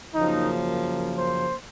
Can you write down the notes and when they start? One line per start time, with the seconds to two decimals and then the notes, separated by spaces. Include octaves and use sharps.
0.14 F#2 C#3 F3 A#3 D#4
1.18 C5